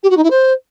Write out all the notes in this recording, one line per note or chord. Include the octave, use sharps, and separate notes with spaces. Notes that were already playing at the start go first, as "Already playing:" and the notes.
G4
F#4
D#4
E4
C5